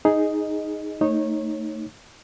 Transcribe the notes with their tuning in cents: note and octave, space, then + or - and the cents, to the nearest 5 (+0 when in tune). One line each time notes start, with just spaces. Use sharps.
D#4 +5 G#4 +0 D#5 +0
A3 +30 D#4 +0 C#5 -20